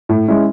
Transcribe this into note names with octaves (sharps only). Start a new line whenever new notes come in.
A2
G#3 C#4 E4